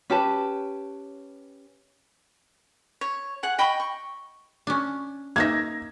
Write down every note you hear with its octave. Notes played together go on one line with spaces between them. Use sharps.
C#4 G4 B4 A5
C#5
G#4 F#5
D#5 G5 B5 C#6
C#6
C#4 D4
A#3 D#4 E5 G#6 A#6